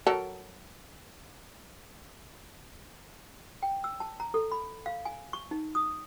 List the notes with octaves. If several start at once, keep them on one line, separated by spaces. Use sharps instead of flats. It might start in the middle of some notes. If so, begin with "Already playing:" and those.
F#3 A4 A#4
G5
E6
A5
A#5
A4
B5
F5
G#5
C#6
D#4
D#6